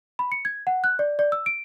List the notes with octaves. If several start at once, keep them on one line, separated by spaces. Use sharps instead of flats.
B5
C#7
G#6
F#5
F#6
D5
D5
E6
D7